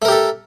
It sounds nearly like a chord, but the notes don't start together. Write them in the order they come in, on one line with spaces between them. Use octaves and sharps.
A3 A#4 G4 A4